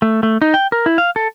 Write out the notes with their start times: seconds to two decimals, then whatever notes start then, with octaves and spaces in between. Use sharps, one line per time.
0.02 A3
0.23 A3
0.42 D#4
0.54 G5
0.72 A#4
0.86 E4
0.98 F5
1.16 A4